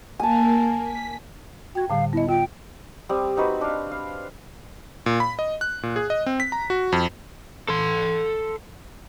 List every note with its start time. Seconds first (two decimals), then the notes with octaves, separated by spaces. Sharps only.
0.20 A#3 G#5 A5
0.83 B6
1.75 F#4 G5 G#6
1.90 A2 D3 G3 F5
2.13 B3 E4 D#5
2.29 F4 G5
3.09 G3 C4 D#6
3.37 C4 D#4 F#4 B4
3.61 D4 F5
3.92 F5
5.06 A#2
5.20 B5
5.39 D#5
5.61 F#6
5.83 A#2
5.96 G#4
6.10 D#5
6.26 C4
6.40 B6
6.52 A#5
6.70 F#4
6.92 F2
7.69 A4 C6